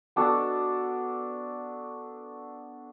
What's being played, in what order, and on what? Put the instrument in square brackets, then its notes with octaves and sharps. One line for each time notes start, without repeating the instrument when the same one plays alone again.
[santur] B3 D4 F#4 A4